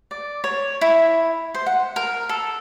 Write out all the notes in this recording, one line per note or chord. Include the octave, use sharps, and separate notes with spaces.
D5
C#5
E4
C5
F#5
A#4
A4